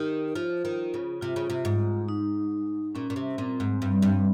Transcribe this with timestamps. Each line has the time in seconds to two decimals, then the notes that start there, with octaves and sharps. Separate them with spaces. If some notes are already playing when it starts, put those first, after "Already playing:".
Already playing: D#3 D#4 G4
0.35 F3 F4
0.65 D#3
0.94 C#3
1.21 C3 F4
1.36 C#3
1.50 C3
1.65 G#2
2.09 D#4
2.95 A#2 C#4
3.10 A#2
3.16 C3
3.38 A#2 C4
3.60 G#2
3.82 G2
4.02 G2